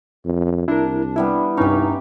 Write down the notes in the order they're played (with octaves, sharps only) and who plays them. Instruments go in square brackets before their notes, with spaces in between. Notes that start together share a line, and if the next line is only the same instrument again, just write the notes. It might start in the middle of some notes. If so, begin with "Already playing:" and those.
[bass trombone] F2
[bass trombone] C2 [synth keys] D4 [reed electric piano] E4 A#4
[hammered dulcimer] E3 G3 B3 [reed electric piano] E4
[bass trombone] C2 [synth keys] G2 D#4 [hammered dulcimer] C#4 G4